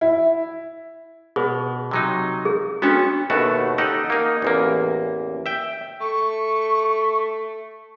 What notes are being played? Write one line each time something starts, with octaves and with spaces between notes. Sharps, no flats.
E4
B2 G#4 B4
C3 F#3 D#4
G#4
B3 C#4 D4 F#4 A4
D#2 B2 A3 F#4 A5
D#4 G4 A4 D#5 F#5
A#3 D#4
A1 E2 A#3
E5 G5
A3 C#6